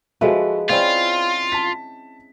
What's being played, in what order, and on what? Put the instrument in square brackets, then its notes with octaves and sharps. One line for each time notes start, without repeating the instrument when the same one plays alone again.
[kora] F3 G#3 B4 [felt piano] F#4 A4 E5
[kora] C4 C#4 E4 [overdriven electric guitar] F4 [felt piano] D5
[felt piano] A5 B6